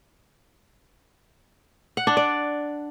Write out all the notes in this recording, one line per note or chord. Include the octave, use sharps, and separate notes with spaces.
F#5
D4
D5